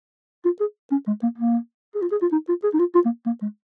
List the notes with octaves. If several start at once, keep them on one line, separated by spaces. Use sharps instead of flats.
F4
G#4
C#4
G#3
A#3
A#3
G#4
F4
G#4
F4
D#4
F4
G#4
D#4
F4
F4
A#3
A#3
G#3